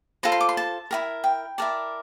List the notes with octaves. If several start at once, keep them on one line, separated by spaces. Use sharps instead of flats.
F4 A4 C5 A#5
C6
D6
C6
A5
E4 G4 A#4
G5
E4 A#4 D5 A5